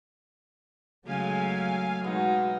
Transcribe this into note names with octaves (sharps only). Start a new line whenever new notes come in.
C#3 F#3 G#3 A3 F5 G#5
B2 F#3 G#3 D#4 D#5 F5